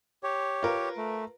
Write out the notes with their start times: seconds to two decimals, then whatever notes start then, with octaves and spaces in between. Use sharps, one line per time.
0.23 G4 C#5
0.63 F4 A#4 B4
0.97 A3